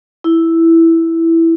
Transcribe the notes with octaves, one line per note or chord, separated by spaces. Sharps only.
E4